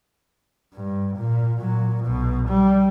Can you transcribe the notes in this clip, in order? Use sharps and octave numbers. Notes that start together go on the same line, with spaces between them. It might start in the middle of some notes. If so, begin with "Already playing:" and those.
G2
A#2
A#2 F#3
B1 B2
G3